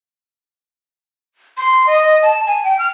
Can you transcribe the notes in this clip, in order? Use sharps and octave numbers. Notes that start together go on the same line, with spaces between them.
C6
D#5
A5
G#5
G5
F6